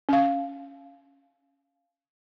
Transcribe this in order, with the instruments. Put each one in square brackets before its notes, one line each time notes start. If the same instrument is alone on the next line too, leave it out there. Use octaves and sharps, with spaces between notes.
[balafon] C#4 F5